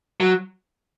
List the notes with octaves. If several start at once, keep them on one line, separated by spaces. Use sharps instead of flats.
F#3